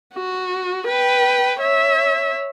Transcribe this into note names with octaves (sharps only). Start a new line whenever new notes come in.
F#4
B4 G5
C#5 E5